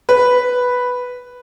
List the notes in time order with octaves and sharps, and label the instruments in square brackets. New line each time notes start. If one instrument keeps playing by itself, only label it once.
[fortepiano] B4